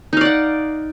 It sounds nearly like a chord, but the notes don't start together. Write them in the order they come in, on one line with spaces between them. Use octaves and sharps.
D#4 F5 D5 F#5